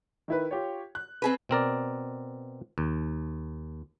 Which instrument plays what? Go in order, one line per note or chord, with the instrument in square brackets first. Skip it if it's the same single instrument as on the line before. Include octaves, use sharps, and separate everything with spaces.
[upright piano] D#3 E4 B4
F4 G4 C#5
F#6
[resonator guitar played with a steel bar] C4 G#4 B4
[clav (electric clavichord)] B2 C4 A#4 D5
D#2